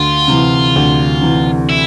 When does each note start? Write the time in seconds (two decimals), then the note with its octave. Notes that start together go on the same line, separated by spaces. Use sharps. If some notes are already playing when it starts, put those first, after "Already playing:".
Already playing: D2 F4
0.28 C3 E3
0.76 D2
1.22 C3 E3
1.69 E4